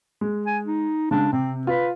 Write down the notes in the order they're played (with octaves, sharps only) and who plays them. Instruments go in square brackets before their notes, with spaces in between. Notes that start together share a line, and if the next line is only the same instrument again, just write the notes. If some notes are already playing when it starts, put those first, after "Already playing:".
[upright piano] G#3
[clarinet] G#5
D#4
[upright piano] C#3 G#3 [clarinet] D4
[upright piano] C3 [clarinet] C4
[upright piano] F4 [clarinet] B4